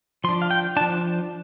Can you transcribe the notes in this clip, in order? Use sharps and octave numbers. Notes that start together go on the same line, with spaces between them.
F3 D4 C6
F5
G5
F3 D4 A5